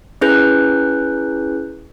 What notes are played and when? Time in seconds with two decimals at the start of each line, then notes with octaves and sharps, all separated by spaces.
0.21 C#4 E4 G#4 B4 F#6 G6